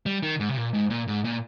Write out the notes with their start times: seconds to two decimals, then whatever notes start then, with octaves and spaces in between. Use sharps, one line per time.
0.06 G3
0.23 D#3
0.40 G#2
0.49 C3
0.57 A#2
0.73 G#2
0.90 A#2
1.08 G#2
1.24 A#2